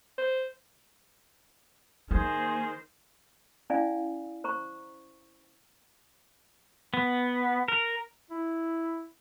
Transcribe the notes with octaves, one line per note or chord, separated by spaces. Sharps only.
C5
D#3 A#3 G#4 C5
C#4 E4 D5 F5 G#5
C5 A#5 C#6
B3
A#4
E4